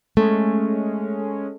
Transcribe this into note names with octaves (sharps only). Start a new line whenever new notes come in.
G#3 A3 C#4